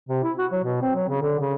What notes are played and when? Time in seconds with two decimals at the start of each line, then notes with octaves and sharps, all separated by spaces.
0.09 C3
0.23 E4
0.38 F#4
0.52 F#3
0.64 B2
0.82 C4
0.95 F#3
1.09 C#3
1.22 D3
1.39 C#3